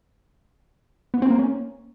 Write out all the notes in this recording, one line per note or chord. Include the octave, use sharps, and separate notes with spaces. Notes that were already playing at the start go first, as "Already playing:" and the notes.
B3
C4
A#3
C#4